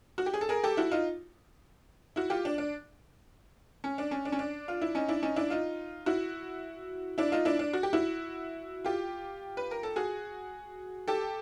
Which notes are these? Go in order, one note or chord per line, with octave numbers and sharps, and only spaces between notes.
F#4
G4
G#4
A4
G#4 A#4
G4 A4
E4 F#4
D#4 F4
E4 F#4
F4 G4
D4
D4
C#4
D4
C#4
D4
C#4
D4
F4
E4
C#4 D#4
D4 E4
C#4 D#4
D4 E4
D#4 F4
E4 F#4
D4 E4
D#4 F4
D4 E4
D4
F#4
G4
E4 F#4
F4 G4
B4
A#4
A4
F#4 G#4
G4 A4